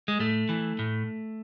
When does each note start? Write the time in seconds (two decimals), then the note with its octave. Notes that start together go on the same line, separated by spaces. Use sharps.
0.08 G#3
0.19 A2 A3
0.49 E3
0.79 A2